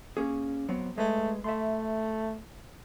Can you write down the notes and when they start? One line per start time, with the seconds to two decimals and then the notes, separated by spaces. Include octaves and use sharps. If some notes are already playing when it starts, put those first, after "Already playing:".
0.17 A#3 C#4 G#4
0.69 F#3 B3 C4
0.98 G#3 A3 B4
1.44 A3 E5 C6